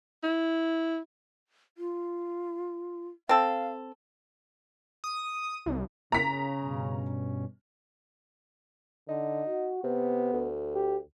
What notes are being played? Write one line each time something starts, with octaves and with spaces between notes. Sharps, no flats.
E4
F4
C4 A4 F5
D#6
C2
C#3 A#5 B6
G2 B2 C#4
D3 D#4
F#4
C3 B3
D2
G4